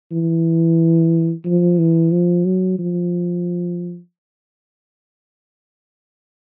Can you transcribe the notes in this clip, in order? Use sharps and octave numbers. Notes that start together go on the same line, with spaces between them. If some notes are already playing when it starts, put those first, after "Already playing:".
E3
F3
E3
F3
F#3
F3